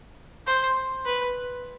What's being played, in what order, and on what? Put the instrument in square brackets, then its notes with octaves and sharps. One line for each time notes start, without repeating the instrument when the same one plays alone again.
[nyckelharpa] C5
B4